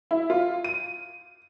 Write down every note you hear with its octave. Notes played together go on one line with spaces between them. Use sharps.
E4
F4
D#7